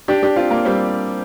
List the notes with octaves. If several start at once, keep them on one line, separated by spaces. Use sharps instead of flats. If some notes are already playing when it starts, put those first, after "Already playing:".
D4 G4
D4 G4
C4 F4
A#3
G3 C4